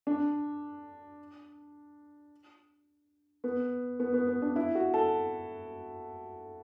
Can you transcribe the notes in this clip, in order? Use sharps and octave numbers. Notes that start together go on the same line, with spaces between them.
D4
B3
B3
B3
B3
D4
E4
F#4
A4